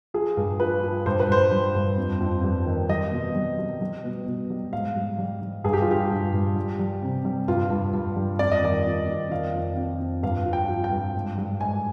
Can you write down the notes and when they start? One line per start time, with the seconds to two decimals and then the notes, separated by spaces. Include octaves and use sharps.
0.14 F3 G#4
0.37 G2
0.60 F3 B4
0.83 F3
1.06 G2 C5
1.20 B4
1.29 G2 C5
1.51 G3
1.75 G2
1.98 F2
2.21 F2
2.44 G3
2.66 D#3
2.89 G3 D#5
3.12 B2
3.35 G3
3.58 G3
3.81 G3
4.04 B2
4.26 B2
4.50 G3
4.73 G#2 F5
4.96 G3
5.18 G3
5.42 G3
5.64 G2 G#4
5.73 G4
5.82 F4
5.87 G3 G4
6.10 G2
6.33 G2
6.56 G3
6.79 G3
7.02 C3
7.25 G3
7.48 G2 F4
7.70 G2
7.94 G2
8.16 G3
8.39 F2 D5
8.52 D#5
8.62 D#3 D5
8.86 F2
9.08 F2
9.31 D#3 F5
9.54 F2
9.77 F2
10.00 F2
10.23 G2 F5
10.46 F3
10.53 G5
10.69 F3
10.84 G5
10.91 G2
11.14 G#2
11.38 G3
11.60 G#2 G#5